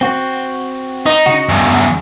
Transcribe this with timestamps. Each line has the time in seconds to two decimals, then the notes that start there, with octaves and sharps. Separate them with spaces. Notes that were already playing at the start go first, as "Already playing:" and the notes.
0.01 C4 F#4
1.06 D#4 D#5
1.26 C#3 F#4
1.49 E2 G2